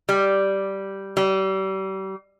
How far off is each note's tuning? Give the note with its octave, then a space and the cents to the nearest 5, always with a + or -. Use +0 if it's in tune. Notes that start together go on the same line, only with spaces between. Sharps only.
G3 -5
G3 -35